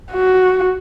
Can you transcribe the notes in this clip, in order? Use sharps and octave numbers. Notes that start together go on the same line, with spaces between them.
F#4